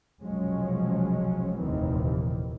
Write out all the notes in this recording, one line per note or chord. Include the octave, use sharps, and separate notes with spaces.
F1 B1 F3 F#3 G#3 C#4
F1 D#2 A#2 D#3 E3 C4